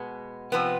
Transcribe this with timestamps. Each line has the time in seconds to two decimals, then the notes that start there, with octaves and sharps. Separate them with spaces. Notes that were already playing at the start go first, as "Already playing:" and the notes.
Already playing: B2 G#3 B3
0.52 C3 F3 B3